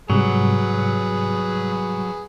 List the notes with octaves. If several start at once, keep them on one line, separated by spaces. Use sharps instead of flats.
G#2 C3 F#3 G3 G#4 B4